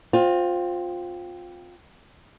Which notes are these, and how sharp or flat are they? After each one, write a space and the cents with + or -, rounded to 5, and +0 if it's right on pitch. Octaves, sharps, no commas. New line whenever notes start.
C4 +0 F4 +20